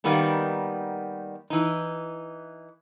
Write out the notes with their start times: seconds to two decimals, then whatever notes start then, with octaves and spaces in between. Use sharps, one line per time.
0.04 D#3 G3 A#3 B3 D#4
1.50 E3 D#4